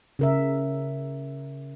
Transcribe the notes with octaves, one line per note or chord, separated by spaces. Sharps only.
C#3 A#4 E5